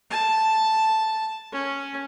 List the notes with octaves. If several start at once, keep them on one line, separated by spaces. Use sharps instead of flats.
A5
C#4